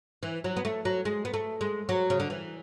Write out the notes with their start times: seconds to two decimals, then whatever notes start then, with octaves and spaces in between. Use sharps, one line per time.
0.23 E3
0.44 F#3
0.57 B3
0.65 A3
0.85 F#3
1.05 G#3
1.25 B3
1.34 A3
1.61 G#3
1.89 F#3
2.10 C#3
2.20 D3
2.30 E3